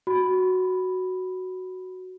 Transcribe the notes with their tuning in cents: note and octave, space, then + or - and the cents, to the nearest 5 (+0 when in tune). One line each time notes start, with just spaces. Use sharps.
F#4 +0 B5 +0